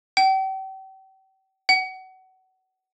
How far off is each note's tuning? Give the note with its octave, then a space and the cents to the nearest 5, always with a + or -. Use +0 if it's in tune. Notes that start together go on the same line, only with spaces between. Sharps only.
G5 -40
F#5 +30